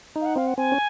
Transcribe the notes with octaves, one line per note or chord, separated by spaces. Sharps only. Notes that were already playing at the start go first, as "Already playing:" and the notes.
D#4
F5
F#5
C4 F5
F#5
C4 G#5
C#4